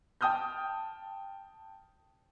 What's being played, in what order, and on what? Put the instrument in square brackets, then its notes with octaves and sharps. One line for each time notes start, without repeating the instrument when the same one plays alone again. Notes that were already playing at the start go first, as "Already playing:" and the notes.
[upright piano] G5 A5 D#6 F6 G6